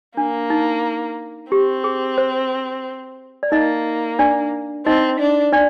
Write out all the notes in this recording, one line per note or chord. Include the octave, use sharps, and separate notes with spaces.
A#3 D4
D#4
C4 G4
G#4
C5
D5
A#3 D#4 D#5
D4 D5
C4 D#4 D#5
D4
D4 D5